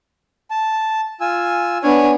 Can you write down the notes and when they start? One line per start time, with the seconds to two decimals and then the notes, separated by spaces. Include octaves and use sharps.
0.51 A5
1.21 F4 G#5 E6
1.83 B3 D4 C#5 G#5